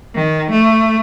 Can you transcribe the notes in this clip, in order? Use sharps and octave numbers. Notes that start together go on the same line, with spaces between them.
D#3
A3